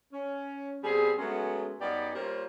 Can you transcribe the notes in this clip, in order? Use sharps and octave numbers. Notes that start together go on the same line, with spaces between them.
C#4
B2 G3 C4 G#4
F#3 G#3 A3 B3 C#4
F#2 G3 B3 D#4 G4 D5
G3 A#3 F4 A#4 C5 C#5